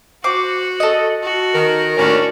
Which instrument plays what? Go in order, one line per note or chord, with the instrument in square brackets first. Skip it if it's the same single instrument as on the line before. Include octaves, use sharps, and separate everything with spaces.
[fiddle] F#4 [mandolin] C5 D6
[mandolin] A4 D#5
[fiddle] F#4
[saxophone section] D#3 [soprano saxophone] A#4
[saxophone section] D#2 A2 C#4 [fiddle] D4 F#4